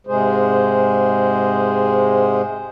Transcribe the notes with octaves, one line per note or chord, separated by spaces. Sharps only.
G#2 C3 G#3 G#4 C5